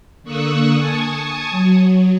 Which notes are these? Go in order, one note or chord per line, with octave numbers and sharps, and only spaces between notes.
D3 A#3 C#6 D#6 E6 F#6
G#5 A5 C#6 D#6
F#3